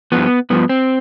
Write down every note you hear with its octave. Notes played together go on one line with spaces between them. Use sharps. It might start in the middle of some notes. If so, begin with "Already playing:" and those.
G2 F3 B3
G2 F3 B3
C4